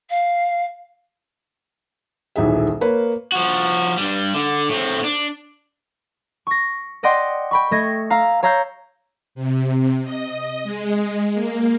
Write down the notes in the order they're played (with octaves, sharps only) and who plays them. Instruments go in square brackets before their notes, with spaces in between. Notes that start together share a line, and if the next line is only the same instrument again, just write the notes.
[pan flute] F5
[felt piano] D#1 B1 E3 G#4 E5
A#3 A#4 B4 C#5 B5
[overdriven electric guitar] F3 F#4
G2 G3
D3
A2 C4
D4
[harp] C#6 A#6
D5 D#5 F#5 G5 C6 D6
G5 B5 C#6
A3 D#5 G#6 A#6
F5 A#5 E6
C#5 F5 A#5 E6 G6 C7
[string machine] C3
D#5
G#3
A#3